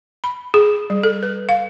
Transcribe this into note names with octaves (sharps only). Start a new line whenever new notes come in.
B5
G#4
G3
A4
B4
F5